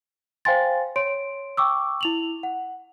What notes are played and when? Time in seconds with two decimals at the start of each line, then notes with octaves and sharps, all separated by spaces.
0.45 C5 F5 G5 G#5 C6 A6
0.96 C#5 C6 D7
1.57 G5 C#6 D6 E6
2.01 E4 F7 F#7
2.43 F#5